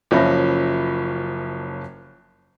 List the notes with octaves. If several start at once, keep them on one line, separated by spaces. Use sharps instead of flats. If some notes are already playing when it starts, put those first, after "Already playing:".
F#1 F3 C#4 E5 B5 A#6